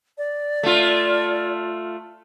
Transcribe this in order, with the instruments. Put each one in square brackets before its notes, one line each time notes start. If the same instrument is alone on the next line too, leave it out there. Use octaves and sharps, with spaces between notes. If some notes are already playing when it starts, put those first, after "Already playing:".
[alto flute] D5
[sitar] A3 F4